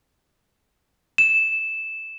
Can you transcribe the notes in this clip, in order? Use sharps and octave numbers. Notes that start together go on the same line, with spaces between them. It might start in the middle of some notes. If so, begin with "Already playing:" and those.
E7